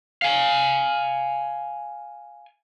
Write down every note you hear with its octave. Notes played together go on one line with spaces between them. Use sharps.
F5 G#5